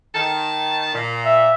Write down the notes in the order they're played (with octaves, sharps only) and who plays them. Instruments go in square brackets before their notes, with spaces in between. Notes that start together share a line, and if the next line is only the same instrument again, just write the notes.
[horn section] D#3 A5
A#2
[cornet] E5